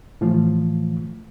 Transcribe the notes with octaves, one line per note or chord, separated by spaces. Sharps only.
A2 E3 F3 A3 F4